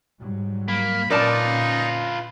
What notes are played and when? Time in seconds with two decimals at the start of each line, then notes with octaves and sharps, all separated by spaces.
0.19 G#2 F#3 G3
0.68 A#3 B5
1.10 A#2 C#4 D#4 F4 A#4 B4 D5 A5